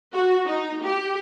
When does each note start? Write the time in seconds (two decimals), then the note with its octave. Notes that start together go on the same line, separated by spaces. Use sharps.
0.13 F#4
0.45 D#4
0.84 G4